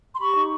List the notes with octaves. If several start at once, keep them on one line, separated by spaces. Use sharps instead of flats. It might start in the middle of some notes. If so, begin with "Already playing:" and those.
C6
G4 B5 C#6
D#4